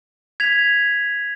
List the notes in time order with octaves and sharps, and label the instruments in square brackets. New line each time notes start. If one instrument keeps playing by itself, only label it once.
[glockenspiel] G#6 B6 F7